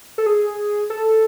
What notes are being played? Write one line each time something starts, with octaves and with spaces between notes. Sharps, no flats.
A4
G#4
A4